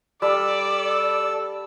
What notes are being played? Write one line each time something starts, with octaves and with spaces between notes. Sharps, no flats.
G3 A4 D5 E6